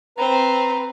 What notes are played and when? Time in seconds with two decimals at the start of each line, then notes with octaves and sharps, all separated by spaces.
0.18 C4 B4 A#5